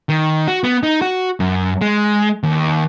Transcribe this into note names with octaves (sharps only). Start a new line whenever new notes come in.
D#3
F#4
B3
D#4
F#4
F#2
G#3
D#2